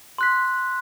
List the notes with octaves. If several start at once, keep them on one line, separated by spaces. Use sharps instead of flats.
C6 F#6 B6